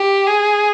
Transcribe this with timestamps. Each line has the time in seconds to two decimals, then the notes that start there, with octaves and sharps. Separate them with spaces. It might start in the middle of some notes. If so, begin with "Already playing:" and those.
Already playing: G4
0.27 G#4